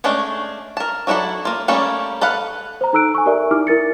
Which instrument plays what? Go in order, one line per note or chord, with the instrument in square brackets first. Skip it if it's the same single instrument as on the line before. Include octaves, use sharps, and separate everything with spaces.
[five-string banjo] G#3 A3 C#4 D4
A#4 A5
F#3 D4 E4 F#4 A4
A#3 F4
G3 A3 A#3 C#4 A4
A4 B4 F5 F#5
[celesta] C5 A#5
D#4 A4 A#5 E6 F#6 D7
G#5 C#6
G4 A#4 D5 E5
D#4 E4 G4 D6 F6
E4 A#4 A6 C#7